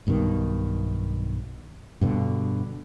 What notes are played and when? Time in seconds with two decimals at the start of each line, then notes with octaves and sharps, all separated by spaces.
0.07 B1 G2 B2 D#3
2.01 G2 B2 D3